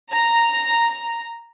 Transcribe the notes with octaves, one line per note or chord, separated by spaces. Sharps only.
A#5